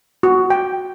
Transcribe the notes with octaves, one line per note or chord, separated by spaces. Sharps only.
F#4
G5